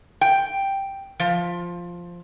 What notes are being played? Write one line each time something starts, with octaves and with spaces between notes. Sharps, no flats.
G5
F3